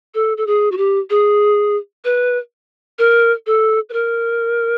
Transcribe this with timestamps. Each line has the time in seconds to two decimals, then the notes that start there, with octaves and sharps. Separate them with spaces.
0.14 A4
0.37 A4
0.47 G#4
0.72 F#4
0.77 G4
1.10 G#4
2.05 B4
2.99 A#4
3.46 A4
3.89 B4
3.93 A#4